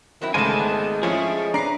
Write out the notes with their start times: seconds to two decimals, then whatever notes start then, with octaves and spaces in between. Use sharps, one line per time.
0.21 D#3 F#3 C4 E4
0.34 G#1 E2 C#3 G#3 A3 C5 G#5 A5
0.59 B3
1.03 F3 A3 C#4 E4 G#4 C#5
1.54 D4 B4 A#5 C7